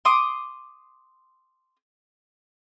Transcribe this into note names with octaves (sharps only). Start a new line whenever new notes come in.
C6 D6 D#6